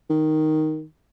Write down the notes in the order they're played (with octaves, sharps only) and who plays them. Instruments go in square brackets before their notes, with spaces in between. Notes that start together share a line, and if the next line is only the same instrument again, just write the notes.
[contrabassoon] D#3